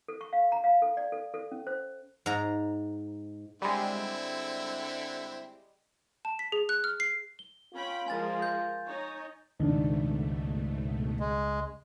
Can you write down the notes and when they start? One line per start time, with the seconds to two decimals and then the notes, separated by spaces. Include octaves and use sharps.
0.08 A4
0.21 C#6
0.33 F5
0.52 A#5
0.64 F5
0.82 A4
0.97 D5
1.12 A4
1.34 A4
1.52 C#4
1.67 C5
2.26 G#2 A#5
3.62 D3 G3 G#3 C4 E4
6.25 A5
6.39 B6
6.52 G#4
6.69 F#6
6.84 F6
7.00 C7
7.39 G7
7.74 C#4 F4 G5 B5
8.08 F3 G#3 A#4 G#5 A6
8.42 G6
8.86 D#4 C#5
9.59 C#2 G#2 B2 D#3 A3 D4
11.20 G#3